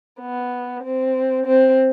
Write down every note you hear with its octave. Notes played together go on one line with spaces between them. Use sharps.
B3
C4
C4